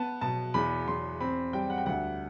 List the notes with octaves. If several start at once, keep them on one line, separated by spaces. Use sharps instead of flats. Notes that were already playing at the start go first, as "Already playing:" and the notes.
Already playing: B3 A5
B2 A5
E2 B5
E2 C6
C4 B5
G3 G5
F#5
G5
D2 F#5